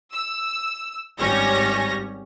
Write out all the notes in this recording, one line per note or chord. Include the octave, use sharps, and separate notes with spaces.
E6
G#1 G3 C#4 C#5 A#6